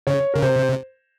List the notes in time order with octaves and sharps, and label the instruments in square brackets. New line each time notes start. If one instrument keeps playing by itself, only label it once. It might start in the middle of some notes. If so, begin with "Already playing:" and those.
[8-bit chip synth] C#3 [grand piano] C#5
[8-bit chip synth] C#3 [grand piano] A#4
[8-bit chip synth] C3 [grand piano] C5